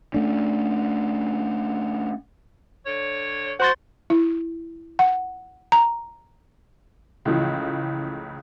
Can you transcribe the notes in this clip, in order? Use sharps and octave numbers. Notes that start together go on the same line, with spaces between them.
A3 C#4 D4
D3 C#5
F#4 C5 C6 A6
E4
F#5
A#5
C#2 A2 C#3 E3 F3